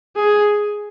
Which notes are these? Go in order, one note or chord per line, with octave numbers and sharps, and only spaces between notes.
G#4